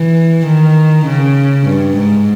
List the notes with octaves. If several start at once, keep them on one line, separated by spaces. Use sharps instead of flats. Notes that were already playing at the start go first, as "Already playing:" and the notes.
Already playing: E3
D#3
C#3
G2
G#2